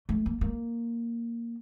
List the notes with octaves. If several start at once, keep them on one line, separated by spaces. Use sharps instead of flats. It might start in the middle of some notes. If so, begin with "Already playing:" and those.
A3
A#3
A#3